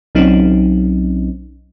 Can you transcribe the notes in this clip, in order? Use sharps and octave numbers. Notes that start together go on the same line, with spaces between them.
B1 F#3 C4 C#4 D#4